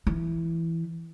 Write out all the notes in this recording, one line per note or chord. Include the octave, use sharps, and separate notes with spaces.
E3